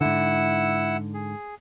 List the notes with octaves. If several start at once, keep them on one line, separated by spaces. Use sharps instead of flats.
G#2 D3 E4 F#5 E6
G#4